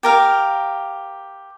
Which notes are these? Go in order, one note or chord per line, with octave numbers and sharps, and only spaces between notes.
G4 A#4 F5